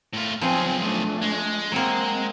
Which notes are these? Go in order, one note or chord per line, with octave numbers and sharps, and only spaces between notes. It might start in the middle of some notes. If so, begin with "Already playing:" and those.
A2 F4
B1 F3 C4 G#4 G#5
A3 D4
G#3
F#3 A#3 C4